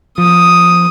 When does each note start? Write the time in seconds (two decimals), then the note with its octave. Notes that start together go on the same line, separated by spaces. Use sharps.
0.18 F3 D#6